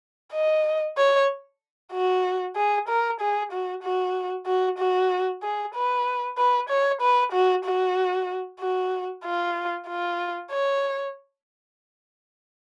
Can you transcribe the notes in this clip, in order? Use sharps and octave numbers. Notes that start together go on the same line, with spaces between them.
D#5
C#5
F#4
G#4
A#4
G#4
F#4
F#4
F#4
F#4
G#4
B4
B4
C#5
B4
F#4
F#4
F#4
F4
F4
C#5